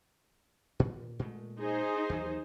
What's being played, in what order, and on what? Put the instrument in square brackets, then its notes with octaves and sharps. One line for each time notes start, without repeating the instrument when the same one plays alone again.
[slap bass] A#2
A#2 G#3 A3
[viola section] D#4 G#4 C5
[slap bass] D#2 E3 F#3